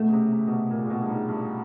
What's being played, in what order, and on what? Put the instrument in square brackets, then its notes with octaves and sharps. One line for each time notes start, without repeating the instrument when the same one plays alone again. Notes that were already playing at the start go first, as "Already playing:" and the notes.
Already playing: [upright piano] B2 [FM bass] A3
[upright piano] C#3
C3
C3
B2
C3
A#2
A#2
B2
G2
G#2
G2